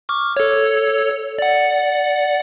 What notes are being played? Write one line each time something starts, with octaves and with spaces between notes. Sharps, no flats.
C#6 D6 F6
A4 C#5
D5 F#5